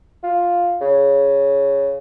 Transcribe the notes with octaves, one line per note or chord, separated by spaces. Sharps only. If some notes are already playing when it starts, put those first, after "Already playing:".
F4
C#3